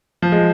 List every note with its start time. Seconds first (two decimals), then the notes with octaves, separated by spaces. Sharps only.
0.22 F3
0.32 G#3